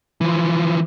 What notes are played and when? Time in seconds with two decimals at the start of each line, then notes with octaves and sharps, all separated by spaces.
0.21 E3 F3